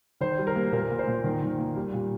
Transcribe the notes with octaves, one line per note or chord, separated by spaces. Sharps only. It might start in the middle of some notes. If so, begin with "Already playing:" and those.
D#3 C5
G3
A#4
A#3
A#2 A#4
A#2
C5
A#2
D#3
D#3
A#3
G3
A#2